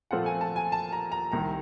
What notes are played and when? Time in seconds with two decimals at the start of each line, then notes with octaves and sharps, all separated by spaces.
0.11 A#2 F3 A3 C4 F4 F#5
0.26 G#5
0.41 A5
0.56 G#5
0.72 A5
0.92 A#5
1.12 A#5
1.32 C2 C3 D#3 A#5